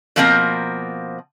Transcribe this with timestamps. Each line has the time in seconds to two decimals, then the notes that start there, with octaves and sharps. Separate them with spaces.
0.16 B2 F3 A#3 C4 C5 A#5